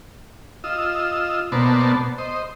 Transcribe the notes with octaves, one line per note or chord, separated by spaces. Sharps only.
F4 D#5 E6
B2 A#3 B3 C5 D5 A5
C5 D#5